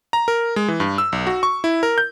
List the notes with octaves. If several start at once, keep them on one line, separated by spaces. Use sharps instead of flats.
A#5
A#4
G#3
E3
G2
E6
B1
F#4
C#6
E4
A#4
G6